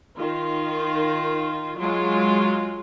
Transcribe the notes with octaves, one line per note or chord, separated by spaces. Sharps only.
D#3 F4
F#3 G#3 F4